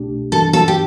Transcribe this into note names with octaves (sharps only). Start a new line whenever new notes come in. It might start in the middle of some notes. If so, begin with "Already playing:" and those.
Already playing: C2 B2 A3 D4 G4
G2 E3 B3 D4 A4
A4
G4